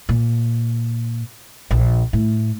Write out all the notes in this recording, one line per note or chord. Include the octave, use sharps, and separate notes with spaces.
A#2
A#1
A2